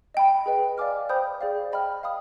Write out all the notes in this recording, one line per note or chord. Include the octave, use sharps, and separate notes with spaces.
D#5 G5 B5
G#4 B4 D#5
D5 F5 G#5 D6 F6
C5 G5 B5 D#6 G6
G#4 D5 F5
D#5 G5 B5 F6
F5 B5 D#6